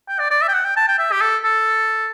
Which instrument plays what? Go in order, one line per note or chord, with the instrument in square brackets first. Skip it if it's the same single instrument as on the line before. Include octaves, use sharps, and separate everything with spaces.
[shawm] G5
D5
D5
E5
G5
F#5
G5
A5
G5
E5
G4
A4
A4